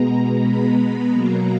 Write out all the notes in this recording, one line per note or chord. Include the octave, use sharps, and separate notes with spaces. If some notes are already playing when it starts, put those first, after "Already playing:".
Already playing: B2 G#3 B3 A#5
B5
B2 F#3 A#3 A#5